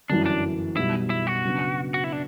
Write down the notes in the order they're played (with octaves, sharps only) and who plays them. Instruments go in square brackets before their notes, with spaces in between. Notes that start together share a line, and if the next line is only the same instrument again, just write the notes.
[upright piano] G1 F#2 E3 [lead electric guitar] D4
[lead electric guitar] D4
[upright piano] B1 B2 G3 [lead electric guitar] E4
[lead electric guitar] E4
F#4
[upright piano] C#3 F#3 B3 D4
[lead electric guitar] F#4
E4
D4